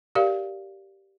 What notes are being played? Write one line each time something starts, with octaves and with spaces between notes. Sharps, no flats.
G4 A#4 D5 F5